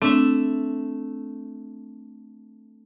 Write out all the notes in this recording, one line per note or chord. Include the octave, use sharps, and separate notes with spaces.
A3 C4 D4 E5